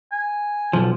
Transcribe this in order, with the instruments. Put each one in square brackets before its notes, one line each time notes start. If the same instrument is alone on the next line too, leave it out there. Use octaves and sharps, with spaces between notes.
[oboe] G#5
[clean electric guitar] B1 F3